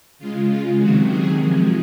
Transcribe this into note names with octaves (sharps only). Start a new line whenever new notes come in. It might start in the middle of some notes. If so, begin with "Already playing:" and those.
C#3 G#3 F4
F4
C3 D#3 F#3 F#4
G#4
C3 F3 G#3